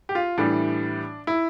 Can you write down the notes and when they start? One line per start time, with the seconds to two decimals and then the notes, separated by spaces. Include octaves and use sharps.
0.09 G4
0.15 F4
0.38 A2 E3 G3 D4
1.27 E4